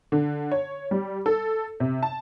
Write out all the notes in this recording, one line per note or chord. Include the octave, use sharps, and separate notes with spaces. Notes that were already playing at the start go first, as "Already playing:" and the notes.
D3
C#5
G3
A4
C3
A5